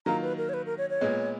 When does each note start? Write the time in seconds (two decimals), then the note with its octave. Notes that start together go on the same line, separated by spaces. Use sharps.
0.06 D#3 F#3 A#3 F4 A#5
0.22 B4
0.38 A#4
0.49 C#5
0.54 B4
0.66 A#4
0.78 C#5
0.90 C#5
1.01 A#2 G#3 B3